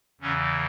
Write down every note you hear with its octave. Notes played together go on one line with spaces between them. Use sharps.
E2 C#3 E3 C#4